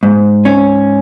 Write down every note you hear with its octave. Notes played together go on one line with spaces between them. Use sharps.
G#2
C#4